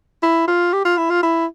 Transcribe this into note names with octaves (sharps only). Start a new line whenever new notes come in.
E4
F4
G4
F4
E4
F4
E4